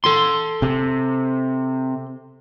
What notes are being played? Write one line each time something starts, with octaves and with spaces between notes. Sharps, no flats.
A4 C6
C3